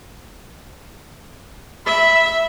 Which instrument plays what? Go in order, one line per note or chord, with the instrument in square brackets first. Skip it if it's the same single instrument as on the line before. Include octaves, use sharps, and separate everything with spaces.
[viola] E5 [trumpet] B5